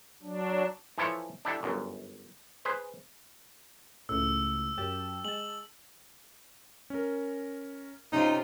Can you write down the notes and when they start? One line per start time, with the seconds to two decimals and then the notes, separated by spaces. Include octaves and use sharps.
0.22 F#3 D4
0.98 E3 F3 E4 A4 C#5
1.45 D4 E4 G4 A4
1.63 G1 F#2
2.65 G#4 B4 C5
4.09 C#2 A2 E6
4.78 F#2 G4 A5
5.24 G#3 A5 F#7
6.90 C#4 A#4
8.12 C3 C#4 D#4 F4 C5